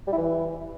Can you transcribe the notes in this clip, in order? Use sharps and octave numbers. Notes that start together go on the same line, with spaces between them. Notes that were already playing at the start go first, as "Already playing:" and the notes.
G3
E4
E3